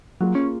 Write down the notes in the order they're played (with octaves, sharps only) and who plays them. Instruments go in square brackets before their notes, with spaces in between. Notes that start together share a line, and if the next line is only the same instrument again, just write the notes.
[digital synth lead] F#3 [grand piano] A#3 F4 G#4
[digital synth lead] C#4